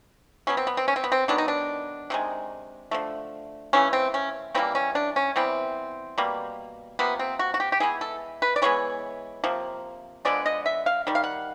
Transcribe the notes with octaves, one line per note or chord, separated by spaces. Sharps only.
B2 F#3 B3 C#4
C4
B3
C4
C#4
C4
B3
C4
D#3 F#3 B3 D4
D#4
D4
C3 D#3 G#3
D3 F3 A3
C#3 E3 A3 C#4
C4
C#4
C#3 E3 G3 A#3 C4
C#4
D4
C#4
E3 G3 B3 C4
B2 G3 A#3
C3 F3 A#3 B3
C4
F#4
F#4
G4
G4
E3 G#3 B3 G#4
A4
B4
D5
E3 G#3 B3 C#5
C3 F3 A#3
D3 F3 G#3 B3 D5
D#5
E5
F5
D#3 G3
F5
F#5